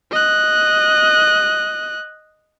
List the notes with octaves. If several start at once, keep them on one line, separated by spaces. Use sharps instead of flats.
D#5 F#6